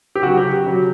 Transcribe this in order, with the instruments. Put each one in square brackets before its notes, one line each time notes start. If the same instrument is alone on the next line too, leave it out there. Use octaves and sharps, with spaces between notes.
[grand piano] G4
C#3 F#3 F#4
G4
C#3 F#3